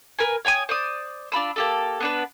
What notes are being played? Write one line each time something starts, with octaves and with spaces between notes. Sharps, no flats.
A#4 B4 G#5
C#5 G5 G#5 D#6
C5 D5 D#6
D4 F4 B5 E6
A#3 G4 A4
B3 D4 B4